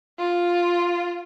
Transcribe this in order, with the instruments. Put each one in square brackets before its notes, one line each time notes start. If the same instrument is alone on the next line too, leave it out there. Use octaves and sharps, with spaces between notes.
[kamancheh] F4